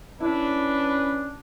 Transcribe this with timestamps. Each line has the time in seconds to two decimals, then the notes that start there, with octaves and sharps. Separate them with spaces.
0.20 C#4 D4 E4 B4